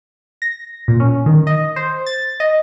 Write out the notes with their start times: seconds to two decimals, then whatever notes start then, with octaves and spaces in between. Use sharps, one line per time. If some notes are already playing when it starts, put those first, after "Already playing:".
0.42 A#6
0.88 A#2
1.00 C#4
1.26 D#3
1.47 D#5
1.76 C5
2.06 A6
2.40 D#5